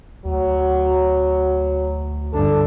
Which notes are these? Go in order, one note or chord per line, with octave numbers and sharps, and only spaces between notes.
D2 F#3
G1 D4 A4